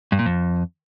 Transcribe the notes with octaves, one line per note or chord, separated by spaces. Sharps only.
G2
A#2
F2